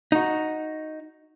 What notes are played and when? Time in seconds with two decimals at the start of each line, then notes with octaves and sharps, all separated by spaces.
0.12 D#4 F#4